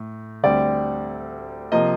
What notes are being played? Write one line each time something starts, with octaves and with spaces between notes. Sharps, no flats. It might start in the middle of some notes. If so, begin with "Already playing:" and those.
Already playing: A2
D2 D3 G3 C4 D5
C3 F3 A#3 D#5